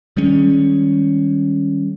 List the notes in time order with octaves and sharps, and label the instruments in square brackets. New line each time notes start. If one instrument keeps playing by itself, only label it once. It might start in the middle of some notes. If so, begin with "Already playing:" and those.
[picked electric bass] D#3 G3 G#3 C#4